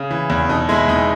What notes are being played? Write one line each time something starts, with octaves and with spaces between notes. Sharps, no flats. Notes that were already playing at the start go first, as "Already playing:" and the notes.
Already playing: C#3
E3
E2
B2 D#4
G#3 E4
E2 D#4